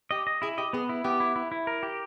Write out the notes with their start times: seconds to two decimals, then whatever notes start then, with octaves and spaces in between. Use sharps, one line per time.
0.11 G4 D#5
0.27 D#5
0.42 E4 G#4
0.58 G4 D#5
0.73 B3 G#4
0.89 E4
1.04 B3 G4
1.20 E4
1.36 E4
1.52 E4
1.67 A#4
1.83 G4